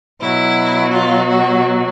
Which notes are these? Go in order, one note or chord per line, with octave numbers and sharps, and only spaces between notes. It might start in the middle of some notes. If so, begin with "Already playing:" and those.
B2 F#3 E4
F4
F#4